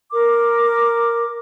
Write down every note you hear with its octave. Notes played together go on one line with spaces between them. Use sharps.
A#4 D6